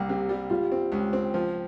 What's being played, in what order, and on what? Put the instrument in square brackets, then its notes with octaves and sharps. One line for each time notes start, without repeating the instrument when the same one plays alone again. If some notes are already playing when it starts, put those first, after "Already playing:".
Already playing: [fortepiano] C2 A#3 [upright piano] G4
[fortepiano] C3
G3
[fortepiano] G3 [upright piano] F4
[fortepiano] C4
C#2
C4
F3